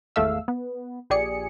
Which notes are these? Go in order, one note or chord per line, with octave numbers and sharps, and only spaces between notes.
G#1 E2 A3 E5 F5 E6
B3
A#1 G4 G#4 D5 C#7